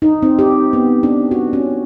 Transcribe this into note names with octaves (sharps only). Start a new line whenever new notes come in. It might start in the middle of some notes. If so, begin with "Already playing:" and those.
D#4
C4
G4
B3
D4
F#4
C#4